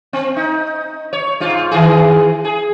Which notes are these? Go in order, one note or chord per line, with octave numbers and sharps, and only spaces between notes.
C4
D#4
C#5
G#2 F4
D#3 E3 G#4
G#4